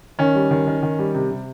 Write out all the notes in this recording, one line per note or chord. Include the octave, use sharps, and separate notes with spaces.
D#3 C#4
G3
D#3
D#3
D#3
G3
C3
C3